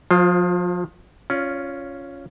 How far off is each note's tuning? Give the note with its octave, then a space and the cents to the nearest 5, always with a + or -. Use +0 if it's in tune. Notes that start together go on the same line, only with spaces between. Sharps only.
F3 +35 F4 +0 C5 +0
C#4 +0 F4 +0 D5 -30